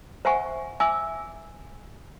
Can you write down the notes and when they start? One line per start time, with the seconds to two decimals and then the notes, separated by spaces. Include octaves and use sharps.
0.25 C5 E5 F#5 G#5 C#6
0.80 E5 G#5 D6 E6